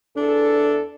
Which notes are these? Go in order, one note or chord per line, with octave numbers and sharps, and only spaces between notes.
E2 D4 A4